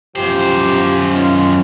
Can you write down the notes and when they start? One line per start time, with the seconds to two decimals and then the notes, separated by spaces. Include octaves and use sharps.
0.16 C2 F#2 F3 G4 C5
1.11 D#3 C#4 F4